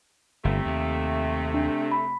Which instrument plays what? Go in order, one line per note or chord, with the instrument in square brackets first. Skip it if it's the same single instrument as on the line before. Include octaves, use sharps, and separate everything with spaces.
[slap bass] G1 [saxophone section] C3 A3
[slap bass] D#2
[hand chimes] D4
B5